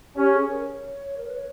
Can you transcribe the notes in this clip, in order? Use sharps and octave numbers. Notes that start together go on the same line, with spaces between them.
C#4 G4
G#4
A#4
C#5
A#4
B4
C#5